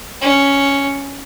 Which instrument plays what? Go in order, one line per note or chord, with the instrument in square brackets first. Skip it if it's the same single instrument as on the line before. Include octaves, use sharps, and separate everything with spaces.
[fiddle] C#4